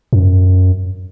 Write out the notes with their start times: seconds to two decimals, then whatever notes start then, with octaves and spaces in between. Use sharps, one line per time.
0.13 F#2